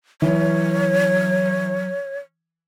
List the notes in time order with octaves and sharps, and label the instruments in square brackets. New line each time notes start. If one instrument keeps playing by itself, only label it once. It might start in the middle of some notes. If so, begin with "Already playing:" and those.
[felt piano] E3 [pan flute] F#3 [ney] C#5